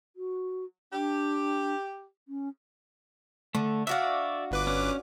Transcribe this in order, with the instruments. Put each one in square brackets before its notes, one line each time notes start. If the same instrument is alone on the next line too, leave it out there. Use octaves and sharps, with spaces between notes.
[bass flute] F#4
[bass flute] D4 [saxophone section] G4
[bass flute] C#4
[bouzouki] D3 [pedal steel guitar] A3
[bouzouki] D4 F#4 F5 [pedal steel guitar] D5 E5
[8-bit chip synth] G1 B4 D6
[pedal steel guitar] C#4